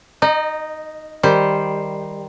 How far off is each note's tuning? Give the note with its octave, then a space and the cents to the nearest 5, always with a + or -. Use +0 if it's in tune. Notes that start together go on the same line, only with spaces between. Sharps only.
D#4 +0 D#5 -35
D#3 +0 G3 +0 C5 +0